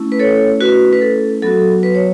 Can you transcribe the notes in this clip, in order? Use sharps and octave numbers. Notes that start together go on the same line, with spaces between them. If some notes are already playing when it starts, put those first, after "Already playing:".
Already playing: A3 C#4 E4
B4
A4 C#5
F#4 B4
B4
A4
F#3 B3 F#4 A4
B4
C#5